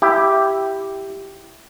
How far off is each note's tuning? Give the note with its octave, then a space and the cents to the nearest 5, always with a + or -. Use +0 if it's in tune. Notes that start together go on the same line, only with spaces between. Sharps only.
E4 +0 G4 +0